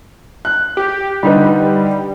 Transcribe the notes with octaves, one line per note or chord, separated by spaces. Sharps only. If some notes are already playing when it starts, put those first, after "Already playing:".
F#6
G4
D3 G3 D#4 B4